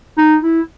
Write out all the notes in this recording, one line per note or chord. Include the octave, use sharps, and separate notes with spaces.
D#4
E4